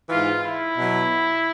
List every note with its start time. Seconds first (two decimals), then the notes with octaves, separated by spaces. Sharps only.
0.09 G#2 E3 F4
0.43 E4
0.78 B2 F#3